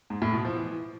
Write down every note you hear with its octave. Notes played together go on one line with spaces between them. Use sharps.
G#2
A2
B2
F3
E3